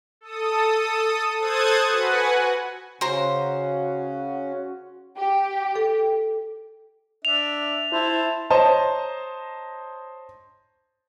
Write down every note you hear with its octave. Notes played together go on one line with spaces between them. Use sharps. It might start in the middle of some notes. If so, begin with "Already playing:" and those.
A4 D#6
A4 C5 D#6 F#6 G#6 A6
F#4 B4 F#5 G#5
C#3 C#4 F#4 C5 A#5
G4
A4
D4 E5 F7
E4 C5 A5
C5 C#5 D#5 A5 A#5